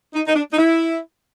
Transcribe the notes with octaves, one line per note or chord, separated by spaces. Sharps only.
D#4
D#4
D4
D#4
E4